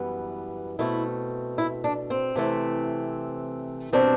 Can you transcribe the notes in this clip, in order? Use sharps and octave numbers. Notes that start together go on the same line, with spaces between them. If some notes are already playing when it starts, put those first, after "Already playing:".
Already playing: F#2 E3 G3 B3
B2 A3 C4 E4
E4
D4
C4
C3 E3 A3 C4
B2 G3 C4 D4